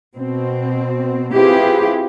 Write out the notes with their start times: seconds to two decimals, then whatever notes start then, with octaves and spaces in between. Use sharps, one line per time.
0.14 B2 C4
1.33 C4 E4 F4 G4 G#4 B4